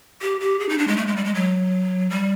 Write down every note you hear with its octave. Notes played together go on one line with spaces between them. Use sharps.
G4
G4
G#4
D#4
D4
G#3
A3
G#3
G3
G#3
F#3
G3